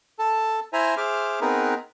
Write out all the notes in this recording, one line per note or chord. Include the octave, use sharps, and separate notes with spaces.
A4 A5
E4 C5 E5 G#5 A#5
G#4 C5 E5 D6 F6
B3 C4 D#4 G#4 A#4 B4